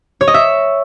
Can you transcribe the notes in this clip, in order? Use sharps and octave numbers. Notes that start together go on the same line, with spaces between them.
C#5
D#5
E5